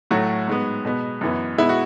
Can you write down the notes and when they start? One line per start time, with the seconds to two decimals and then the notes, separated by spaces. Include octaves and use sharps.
0.11 A2 F#3 A3 F#4
0.48 G#2 G#3 B3
0.85 B2 G#3 B3
1.21 F#2 E3 B3
1.58 B2 G#3 B3 E4
1.69 F#4